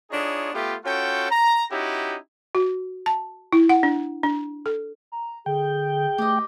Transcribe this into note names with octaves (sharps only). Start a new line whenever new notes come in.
D4 D#4 F4 G#4 C#5
A3 B3 F4 G4
C#4 F4 F#4 A4 G5
A#5
C#4 D#4 E4 F#4 G4
F#4
A5
E4
F#5
D4
D4
A4
A#5
D3 G#4 G5
A3 G4 D#5